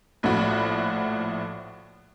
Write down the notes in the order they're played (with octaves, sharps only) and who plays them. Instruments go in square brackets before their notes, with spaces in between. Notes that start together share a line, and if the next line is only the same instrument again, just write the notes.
[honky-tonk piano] A#1 A2 F3 F#4 B5